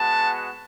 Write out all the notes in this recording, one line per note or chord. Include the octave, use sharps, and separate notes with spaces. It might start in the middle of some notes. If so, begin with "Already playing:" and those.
Already playing: G#3 B3 F#4 A5